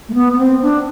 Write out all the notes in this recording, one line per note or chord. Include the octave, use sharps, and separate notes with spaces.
A3
B3
B3
C4
D4